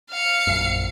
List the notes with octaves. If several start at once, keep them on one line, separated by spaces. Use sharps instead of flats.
F5 C#7
A#1 F#2